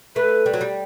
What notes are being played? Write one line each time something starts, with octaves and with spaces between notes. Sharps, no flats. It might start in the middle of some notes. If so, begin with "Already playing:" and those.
A3 B4
G3
F#3
G3